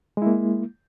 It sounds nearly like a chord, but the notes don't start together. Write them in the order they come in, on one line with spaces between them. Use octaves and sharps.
G#3 E4 A#3